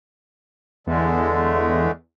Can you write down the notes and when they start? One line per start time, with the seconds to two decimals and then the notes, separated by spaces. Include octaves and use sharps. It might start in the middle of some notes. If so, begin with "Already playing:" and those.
0.87 E2 D3 G#3 A3